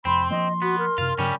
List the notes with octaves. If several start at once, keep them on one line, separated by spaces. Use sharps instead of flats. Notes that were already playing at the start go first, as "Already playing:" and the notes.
F1 F2 C4 B5 C6
F3 A#3 D#5 C6
B3 F#4
A#4
F#2 C3 F4
G2 C#3 F#3 G3 C#4 G5